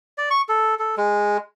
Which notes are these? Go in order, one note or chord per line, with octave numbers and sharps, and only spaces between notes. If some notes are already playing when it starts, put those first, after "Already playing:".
D5
C#6
A4
A4
G#3